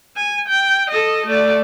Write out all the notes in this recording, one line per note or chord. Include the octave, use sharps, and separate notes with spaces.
G#5
G5
A4 D#5
A3 D5